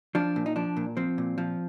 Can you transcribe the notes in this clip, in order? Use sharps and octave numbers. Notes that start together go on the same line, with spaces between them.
F3 D4
A#2
D#4
F3 D4
A#2
F3 C4
A#2
F3